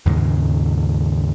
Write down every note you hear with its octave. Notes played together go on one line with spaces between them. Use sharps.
D#2 G#2 C#3 G#3